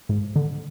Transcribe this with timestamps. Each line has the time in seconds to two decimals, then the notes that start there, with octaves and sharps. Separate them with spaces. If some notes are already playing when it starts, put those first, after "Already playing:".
0.09 G#2
0.36 D3